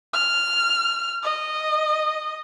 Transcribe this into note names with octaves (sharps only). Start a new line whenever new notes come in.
F6
D#5